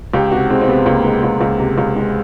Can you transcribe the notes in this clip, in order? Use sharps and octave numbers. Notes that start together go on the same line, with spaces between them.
C#2 G4
C3 F#4
G#3 C4
C4
C3 B3
C#2 A#3
G#3
C#2
C#2
C3
C#2
G#3